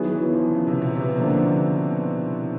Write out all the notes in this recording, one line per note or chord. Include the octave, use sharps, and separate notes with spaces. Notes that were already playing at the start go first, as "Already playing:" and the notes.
Already playing: D#3 F#3 B3 E4 G#4
E3
F3
C#3
C3
B2
C3
D3 F3 A#3 D4